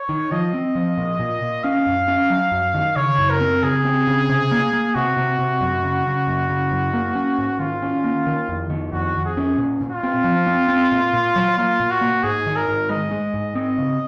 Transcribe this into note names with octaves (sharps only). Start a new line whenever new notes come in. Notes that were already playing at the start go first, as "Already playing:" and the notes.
Already playing: C#5
D#3
F3 D#5
C4
F3
A#2
A#2
A#2
C#4 F5
F#2
C#4
F#3
F#2
D#3
C#3 C#5
F#2
A#4
C4
C#3 G#4
C4
C#3
C3
A#3
A#3
C3 F#4
C3
C3
F#2
C#3
C#3
F#2
C#3
F#2
A#3
C#4
G#2
D#3 F4
C#4
A#3
D#3
F2
D#3
F2 F#4
F2
G#4
C#4
A#2
A#2
F4
C4
F3
C4
C4
A#2
A#2
F#3
A#3 F4
A#2
F#4
A#3
G#2 G#4
D#3
A#4
G#2
G#3 D#5
G#3
G#2
C4 D#5
C#3